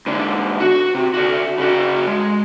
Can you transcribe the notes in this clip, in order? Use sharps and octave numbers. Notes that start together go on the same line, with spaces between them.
G#2 D3
F#4
C3
D3 F#4
C#3 F#4
G#3